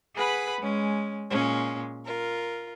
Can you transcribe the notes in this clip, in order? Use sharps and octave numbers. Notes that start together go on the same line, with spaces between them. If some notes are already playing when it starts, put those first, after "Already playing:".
G#4 B4 F#5 B5
G#3 C#4
A#2 G#3 C#4
F4 A#4